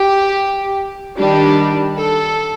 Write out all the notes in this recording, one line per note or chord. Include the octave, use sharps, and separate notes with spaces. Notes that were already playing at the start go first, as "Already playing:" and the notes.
Already playing: G4
D#3 G3 D4 G4
A4